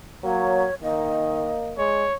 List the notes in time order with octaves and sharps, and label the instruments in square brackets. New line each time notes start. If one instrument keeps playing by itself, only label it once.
[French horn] F#3 [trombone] A#3 [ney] C#5
[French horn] D#3 [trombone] A#3 [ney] D#5
[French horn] G#3 [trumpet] C#5